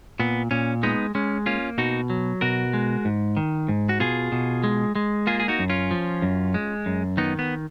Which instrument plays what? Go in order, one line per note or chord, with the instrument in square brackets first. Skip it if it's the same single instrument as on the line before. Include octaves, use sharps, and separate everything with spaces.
[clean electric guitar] A#2 B3
A#2 C#4
G#3 B3 D#4
G#3 C#4
A#3 C#4 F4
B2 D#4 F#4
F#3
B2 F#4 A#4
G#3
G#2
D#3
G#2
F#4
B2 F4 G#4
B2
G#3
G#3
A#3 F4 G#4
G#4
D#4 F#4
F#2
C#4 F4
F3
F#2
G#3
F#2
D#3 B3 D#4
B3